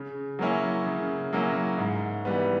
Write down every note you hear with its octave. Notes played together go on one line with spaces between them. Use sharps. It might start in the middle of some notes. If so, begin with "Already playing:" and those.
Already playing: C#3
F#3 A#3 C#4 E4
C#3
F#3 A#3 C#4 E4
G#2
E3 G3 B3